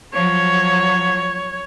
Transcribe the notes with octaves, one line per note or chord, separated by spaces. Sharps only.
F3 F#3 C#5